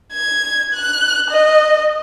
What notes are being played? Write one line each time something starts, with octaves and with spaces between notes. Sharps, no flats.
G#6
F#6
D#5